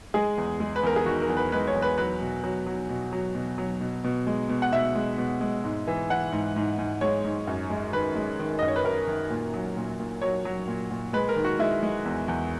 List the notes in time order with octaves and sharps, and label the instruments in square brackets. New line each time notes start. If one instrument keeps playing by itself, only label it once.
[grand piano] G#3 G#4
E2
G#3
B4
E2 A#4
G#4
D#3 F#4
A#4
E2
B4
G#3 B4
C#5
E2
B4
F#3 B4
B2
F#3
F#3
B2
F#3
B2
F#3
B2
B2
G#3
B2
F#5
B2 E5
G#3
B2
G#3
G#2
E3
E3 F#5
G#2
G#2
G#2
G#3 C#5
G#2
F#2
G#3
D#3 B4
G#3
D#3
F#2 D#5
C#5
B4
F#2 A#4
D#3
A#2
F#3
A#2
A#2
F#3 C#5
F#3
A#2
A#2
G#3 B4
A#4
D#3
F#4
G#3 E4
G#3
E2
E2